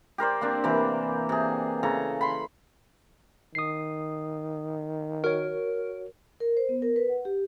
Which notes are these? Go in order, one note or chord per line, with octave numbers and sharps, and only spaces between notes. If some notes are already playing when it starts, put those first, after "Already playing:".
G4 A#4 C5 D5
A#3 C4 D4
C3 E3 A#3 D6
C3 G#4
C#3 A4 A#5 C#6
B5 C6
D#3 D#6 C7
F#4 A#4 C#5
A#4
C5
B3
A#4
B4
F#5
G4